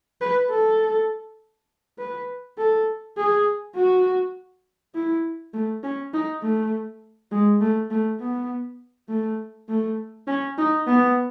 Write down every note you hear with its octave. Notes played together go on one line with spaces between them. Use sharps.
B4
A4
B4
A4
G#4
F#4
E4
A3
C#4
D#4
A3
G#3
A3
A3
B3
A3
A3
C#4
D#4
B3